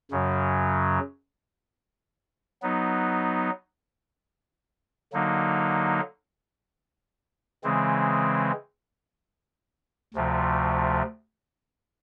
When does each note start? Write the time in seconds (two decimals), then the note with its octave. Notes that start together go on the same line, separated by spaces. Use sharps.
0.11 F#2 C#3 F#3
2.62 F#3 B3 D#4
5.13 D3 F#3 A#3 D#4
7.64 C#3 E3 G#3 C4
10.14 D2 C3 F3 A3